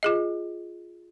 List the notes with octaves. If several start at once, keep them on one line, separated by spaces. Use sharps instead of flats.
F4 G#4 D#5